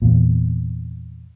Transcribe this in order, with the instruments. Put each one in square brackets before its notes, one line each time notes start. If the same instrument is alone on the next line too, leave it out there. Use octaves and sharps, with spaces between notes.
[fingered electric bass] E2 A#2